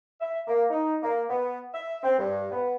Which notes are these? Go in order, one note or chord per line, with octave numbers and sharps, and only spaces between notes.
E5
A#3
D#4
A#3
B3
E5
C4
G2
B3